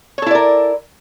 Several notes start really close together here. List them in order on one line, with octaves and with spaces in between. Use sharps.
C#5 A4 E4 D5 A#4